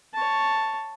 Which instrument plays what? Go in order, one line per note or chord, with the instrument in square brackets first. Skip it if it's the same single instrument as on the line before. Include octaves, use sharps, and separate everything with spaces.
[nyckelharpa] C#5 A5